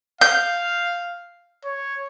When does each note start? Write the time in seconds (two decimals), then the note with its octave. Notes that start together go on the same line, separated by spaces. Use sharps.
0.21 F5 G6
1.64 C#5